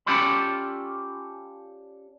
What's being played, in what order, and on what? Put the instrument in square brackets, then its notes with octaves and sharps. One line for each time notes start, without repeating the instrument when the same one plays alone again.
[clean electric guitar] C#4 F4 G4 A4 D5 B5